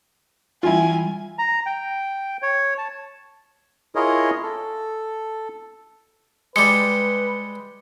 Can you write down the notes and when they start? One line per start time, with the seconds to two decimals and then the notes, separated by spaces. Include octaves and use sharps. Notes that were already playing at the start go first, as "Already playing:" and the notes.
0.63 E3 G3 E4 F4 G#5
1.38 A#5
1.66 G5
2.42 C#5
2.78 A5
3.95 E4 F4 G#4 A#4 C#5 D#5
4.43 A4
6.56 G3 G#3 B4 C#7